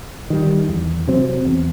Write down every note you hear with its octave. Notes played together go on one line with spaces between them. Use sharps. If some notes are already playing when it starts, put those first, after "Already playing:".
D#3 G3
E2
C3 F#3 C4
E2